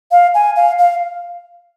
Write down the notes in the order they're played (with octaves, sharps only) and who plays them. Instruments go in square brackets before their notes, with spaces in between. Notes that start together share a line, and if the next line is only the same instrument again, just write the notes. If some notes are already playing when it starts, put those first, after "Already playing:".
[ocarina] F5
G#5
F5
F5